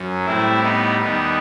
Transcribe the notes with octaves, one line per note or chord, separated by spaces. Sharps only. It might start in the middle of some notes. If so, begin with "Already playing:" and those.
Already playing: F#2 F#3
A2 G3 C4 E4
B3 D#4
D#2 D#3 G3 B3